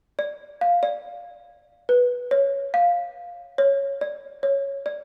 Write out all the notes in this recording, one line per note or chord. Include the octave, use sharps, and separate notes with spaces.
D5
F5
D5
B4
C#5
F5
C#5
D5
C#5
D5